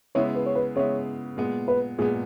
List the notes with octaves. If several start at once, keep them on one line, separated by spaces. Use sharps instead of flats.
C#3 G#3 B3 E4 C#5
B4
C#5
B4
C#3 G#3 B3 E4 C#5
A#2 G#3 B3
B4
A#2 G#3 B3 G#4